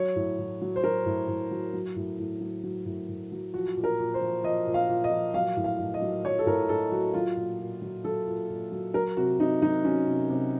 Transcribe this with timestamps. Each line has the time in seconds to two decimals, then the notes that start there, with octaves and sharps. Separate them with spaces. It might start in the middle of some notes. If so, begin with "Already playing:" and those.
Already playing: F#3 C#5
0.16 A2
0.39 A2
0.62 F#3
0.76 C5
0.84 F#3 A#4
1.06 A2
1.28 A2
1.51 F#3
1.74 F#3
1.96 A2
2.19 A2
2.41 F#3
2.63 F#3
2.86 A2
3.09 A2
3.32 F#3
3.54 F3 F#4
3.77 A#2
3.84 A#4
3.99 A#2
4.14 C5
4.21 F3
4.44 F3 D#5
4.67 A#2
4.74 F5
4.89 A#2
5.04 D#5
5.11 F3
5.34 F#3 F5
5.57 A2
5.64 F5
5.79 A2
5.94 D#5
6.01 F#3
6.24 F#3 C#5
6.39 A4
6.46 A2 A#4
6.69 A2 A4
6.92 F#3 F#4
7.14 F#3 F4
7.37 A#2
7.59 A#2
7.82 F#3
8.04 F#3 A4
8.27 A#2
8.50 A#2
8.72 F#3
8.94 F#3 A#4
9.17 C3 F#4
9.40 C3 D#4
9.62 F#3 D#4
9.85 F#3 C#4
10.07 C3
10.30 C3